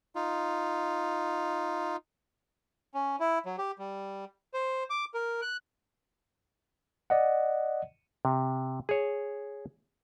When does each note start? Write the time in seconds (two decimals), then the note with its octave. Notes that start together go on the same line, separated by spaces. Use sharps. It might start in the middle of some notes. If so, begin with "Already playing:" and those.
0.15 D#4 F4
2.94 C#4
3.20 E4
3.46 F#3
3.58 G4
3.79 G3
4.54 C5
4.90 D6
5.14 A#4
5.42 F#6
7.10 D5 D#5 F#5
8.25 C3
8.89 G#4 C#5